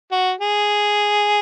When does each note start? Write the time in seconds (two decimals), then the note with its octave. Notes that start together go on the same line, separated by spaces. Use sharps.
0.12 F#4
0.40 G#4